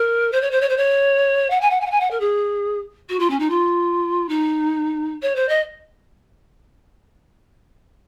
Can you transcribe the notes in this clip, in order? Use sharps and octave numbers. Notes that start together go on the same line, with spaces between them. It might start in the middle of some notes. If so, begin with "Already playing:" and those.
Already playing: A#4
C5
C#5
C5
C#5
C5
C#5
F#5
G#5
F#5
G#5
F#5
G#5
F#5
A#4
G#4
F#4
F4
C#4
D#4
F4
D#4
C#5
C5
D#5